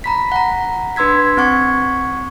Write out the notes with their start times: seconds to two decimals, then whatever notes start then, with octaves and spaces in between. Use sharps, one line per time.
0.04 A#5 B5 B6
0.32 F#5 A#5
0.96 D4 B4 C6 E6 G#6 B6
1.37 C4 F#5 C#6 G#6